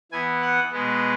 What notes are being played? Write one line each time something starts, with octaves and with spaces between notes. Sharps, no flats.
E3 B3 G#5
F#5
B2 G#3 B3